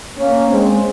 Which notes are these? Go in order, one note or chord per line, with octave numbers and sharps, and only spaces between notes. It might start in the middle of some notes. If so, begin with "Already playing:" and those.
A#3 C#4
G#3 C4